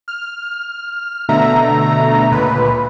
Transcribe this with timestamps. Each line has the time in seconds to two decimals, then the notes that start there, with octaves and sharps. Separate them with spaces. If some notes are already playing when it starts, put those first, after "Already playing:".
0.08 F6
1.29 B2 D3 A3 E5 A#5
2.31 C#2 A#2 B4